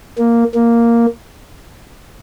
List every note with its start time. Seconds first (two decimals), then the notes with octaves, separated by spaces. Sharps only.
0.18 A#3
0.55 A#3